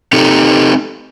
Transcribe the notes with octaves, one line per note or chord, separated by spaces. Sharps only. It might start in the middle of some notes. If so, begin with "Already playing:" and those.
C4 D#4 G4 A4